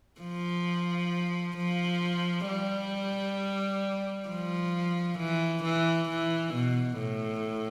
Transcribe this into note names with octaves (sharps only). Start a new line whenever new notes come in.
F3
F3
G3
F3
E3
E3
E3
B2
A2